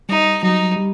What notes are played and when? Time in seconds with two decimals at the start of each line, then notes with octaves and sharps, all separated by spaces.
0.09 G3 D#4
0.43 F#3 D#4
0.76 G3